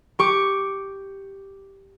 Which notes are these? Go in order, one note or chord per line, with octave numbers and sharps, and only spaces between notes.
G4 C#6 D6